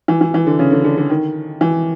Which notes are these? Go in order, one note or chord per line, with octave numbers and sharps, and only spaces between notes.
E3
E3
E3
D3
C#3
D3
D3
D3
D#3
E3